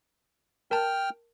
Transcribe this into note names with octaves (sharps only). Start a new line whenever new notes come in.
A#4 G5 A5 F6